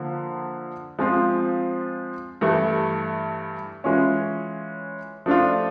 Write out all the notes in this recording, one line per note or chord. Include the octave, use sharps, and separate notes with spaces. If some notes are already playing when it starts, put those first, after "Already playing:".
Already playing: D3 F3 A#3
F3 G#3 C4 F4
G2 E3 A3
E3 G#3 C#4 F4
F3 A3 D4 F4